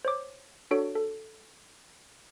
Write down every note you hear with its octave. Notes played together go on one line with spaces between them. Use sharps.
C5 C#5 D6
D4 F#4 A4 C#5 D7
A4